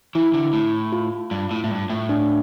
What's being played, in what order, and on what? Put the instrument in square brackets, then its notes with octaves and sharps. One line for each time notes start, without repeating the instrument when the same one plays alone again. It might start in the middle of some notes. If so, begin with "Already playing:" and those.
[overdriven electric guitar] E3 [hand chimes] E4
[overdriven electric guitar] D3
A2
[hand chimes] F4
[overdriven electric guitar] G2
A2
A2
G2
A2
[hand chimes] D4